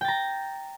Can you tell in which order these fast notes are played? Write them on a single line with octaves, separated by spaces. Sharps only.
G5 A6 A#5